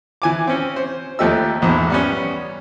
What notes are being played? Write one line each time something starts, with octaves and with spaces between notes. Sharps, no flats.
E3 G#5 D6
C4 C#4
C5
D#2 F3 A3 G4 D#5 E6
A#1 E2 G#2
G3 B3 C#4